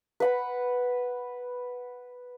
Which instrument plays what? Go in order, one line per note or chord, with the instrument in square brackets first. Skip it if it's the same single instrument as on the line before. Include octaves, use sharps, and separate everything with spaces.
[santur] B4 F#5 B5